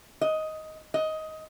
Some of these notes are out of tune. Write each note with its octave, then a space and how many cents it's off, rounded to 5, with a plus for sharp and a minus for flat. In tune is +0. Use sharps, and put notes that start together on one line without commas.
D#5 +10
D#5 +15